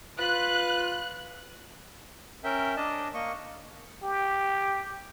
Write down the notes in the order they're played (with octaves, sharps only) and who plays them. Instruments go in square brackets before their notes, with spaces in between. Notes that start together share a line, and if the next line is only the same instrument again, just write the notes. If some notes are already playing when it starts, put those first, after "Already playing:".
[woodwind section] F4 B4 [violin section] F#6
[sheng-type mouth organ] C#4 A#4 E5 G5
D4 D#5 A5
A#3 D#5 C#6
[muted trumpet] G4